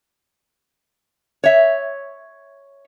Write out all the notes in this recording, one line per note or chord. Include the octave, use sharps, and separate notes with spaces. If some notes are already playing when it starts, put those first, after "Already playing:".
C#5 E5